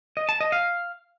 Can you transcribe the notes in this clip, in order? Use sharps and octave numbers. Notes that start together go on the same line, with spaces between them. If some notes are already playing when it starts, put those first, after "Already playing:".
D#5
A5
D#5
F5